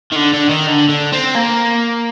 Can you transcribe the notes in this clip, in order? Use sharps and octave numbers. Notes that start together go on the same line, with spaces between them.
D#3
D3
D3
D#3
D3
D3
C4
A#3